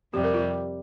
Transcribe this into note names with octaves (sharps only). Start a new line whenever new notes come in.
F2 C3 G3 G4
A#4
F4